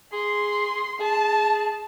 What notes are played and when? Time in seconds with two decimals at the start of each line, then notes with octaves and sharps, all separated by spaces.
0.13 G#4 C6
1.00 G#4 A5